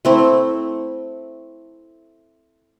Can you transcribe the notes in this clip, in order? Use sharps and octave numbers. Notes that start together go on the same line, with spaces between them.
A3 C4 E4